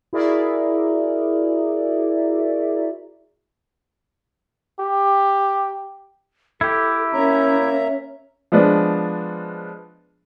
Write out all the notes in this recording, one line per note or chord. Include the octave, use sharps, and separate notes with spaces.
E4 F#4 G#4 A#4 D5 E5
G4
E4 G4 A4
A#3 C#4 C#5 E5 A#5
F3 G#3 B3 D4